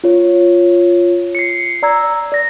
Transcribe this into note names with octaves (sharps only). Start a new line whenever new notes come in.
F4 C#5
C7 C#7
D5 A#5 E6 G#6
D5 A#6